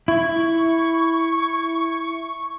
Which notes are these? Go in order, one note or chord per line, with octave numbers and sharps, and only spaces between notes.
E4 C#6